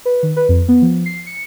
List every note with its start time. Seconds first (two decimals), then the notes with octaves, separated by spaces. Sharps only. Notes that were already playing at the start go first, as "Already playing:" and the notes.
0.05 B4
0.23 D#3
0.37 B4
0.49 F2
0.68 B3
0.82 F3
1.06 C7
1.27 C#7